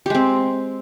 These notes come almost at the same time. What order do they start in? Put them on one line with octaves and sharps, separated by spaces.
G4 G#3 C4